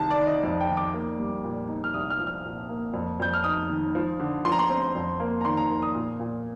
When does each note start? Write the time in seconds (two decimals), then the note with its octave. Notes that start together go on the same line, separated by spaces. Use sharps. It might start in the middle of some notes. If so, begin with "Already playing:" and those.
Already playing: C2 D#3 A5
0.10 D5
0.19 D#3
0.27 D#5
0.43 F2 D5
0.61 G5
0.68 D#3
0.77 D6
0.93 A#3
1.19 G3
1.44 A#2
1.68 D#4
1.84 F6
1.94 C2 D#6
2.10 F6
2.19 F3
2.27 F6
2.45 A#2
2.69 A#3
2.94 F2
3.20 F2 G6
3.34 F6
3.44 D#4 D#6
3.69 D#3
3.95 F3
4.20 D3
4.45 F3 C6
4.52 A#5
4.59 C6
4.69 C4
4.95 F2
5.20 A#3
5.41 A#5
5.45 D#3 C6
5.57 A#5
5.70 A#3
5.82 D#6
5.95 A#2
6.20 A#2